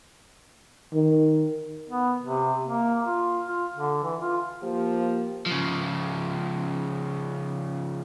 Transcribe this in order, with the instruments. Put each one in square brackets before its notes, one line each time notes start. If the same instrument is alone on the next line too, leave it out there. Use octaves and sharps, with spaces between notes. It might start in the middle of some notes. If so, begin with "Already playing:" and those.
[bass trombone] D#3
[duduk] B3
C3
A#3
F4
F4
D3
E3
F4
[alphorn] F3 [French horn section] A#3 G4
[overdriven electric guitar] C#3 F3